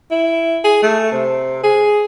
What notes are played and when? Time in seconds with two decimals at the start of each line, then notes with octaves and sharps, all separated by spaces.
0.11 E4
0.64 G#4
0.83 A3
1.12 C3
1.64 G#4